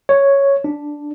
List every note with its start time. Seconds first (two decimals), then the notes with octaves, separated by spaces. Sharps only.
0.09 C#5
0.64 D4